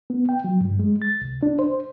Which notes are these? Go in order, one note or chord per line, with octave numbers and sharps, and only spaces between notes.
B3
G5
F#3
G2
G#3
A6
C2
D4
C5